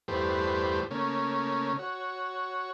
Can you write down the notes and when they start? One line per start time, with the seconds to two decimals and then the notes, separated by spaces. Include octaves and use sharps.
0.08 E2 G2 A3 G4 B4 C5
0.91 C#3 A3 A#3 C#4
1.79 F#4 C#5